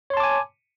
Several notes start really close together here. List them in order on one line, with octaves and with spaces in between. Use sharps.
C#5 C6 A5 D6 G#5